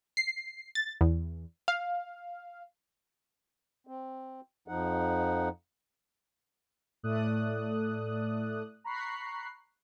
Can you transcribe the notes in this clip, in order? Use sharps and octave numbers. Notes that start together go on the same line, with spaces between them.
C7
A6
E2
F5
C4
F2 F3 D#4 F#5
A2 A3 D5 D#6 F#6
A#5 B5 C#6 F#6 C7